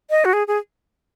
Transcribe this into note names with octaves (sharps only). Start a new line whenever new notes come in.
D#5
F#4
G#4
G#4